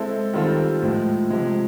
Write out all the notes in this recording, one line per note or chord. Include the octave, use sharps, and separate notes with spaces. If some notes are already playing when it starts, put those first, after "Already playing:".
Already playing: G#3 C4 E4 A4
D#3 G3 C4 F4 A4
A2 F3 G#3
C3 F3 G#3